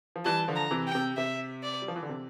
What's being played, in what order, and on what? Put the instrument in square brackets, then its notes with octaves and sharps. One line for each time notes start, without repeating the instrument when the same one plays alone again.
[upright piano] F3
[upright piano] E3 G3 [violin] A5
[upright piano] D3 F3
[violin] A#5
[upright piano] C3 E3
[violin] G5
[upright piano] C3
[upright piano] C3 [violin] E5
[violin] D5
[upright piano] G3
F3
E3
D3
C3